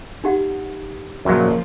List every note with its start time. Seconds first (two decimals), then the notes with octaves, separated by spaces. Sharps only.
0.24 D#4 G4 F#5
1.25 F#2 A#2 C#3 F3 F#3 A#3